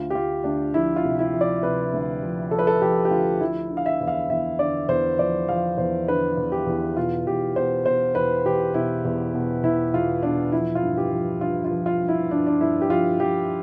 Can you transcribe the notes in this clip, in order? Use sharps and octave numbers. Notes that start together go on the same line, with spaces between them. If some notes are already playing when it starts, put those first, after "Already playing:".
Already playing: D2 F4
G4
D2 F4
D2 D4
F3 E4
F4
C3
E4
F3
D5
C3 B4
D2
F3
F3 A4
B4
A4
F3 G4
G4
D2 F4
F3 E4
D3
F5
E5
E2
F5
E2 E5
D3 D5
E2 C5
F3 D5
F3 F5
E2 C5
D3 B4
E2
G4
E2
B2 F4
E2 G4
B2 C5
B2 C5
E2 B4
E2 G4
B2 E4
E2
B2
E2 E4
E2 F4
B2 D4
F3 E4
F4
G2
G4
F3
G2 F4
F4
F3
F4
G2
E4
G2 D4
D4
G2 E4
G4
F3 F4
F3 G4